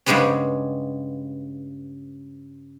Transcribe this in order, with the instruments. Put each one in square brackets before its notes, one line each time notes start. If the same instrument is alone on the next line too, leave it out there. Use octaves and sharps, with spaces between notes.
[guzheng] G2 C#3 G3 G#3 B3 C#4